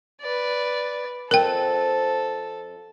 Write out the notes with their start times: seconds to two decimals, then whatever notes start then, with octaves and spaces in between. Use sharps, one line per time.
0.21 B4 D5
1.31 F2 F3 C4 A4 A#4 G5